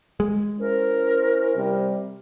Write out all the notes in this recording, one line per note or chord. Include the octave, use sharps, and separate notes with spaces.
G#3
C#4 E4 A#4 C5
C3 G3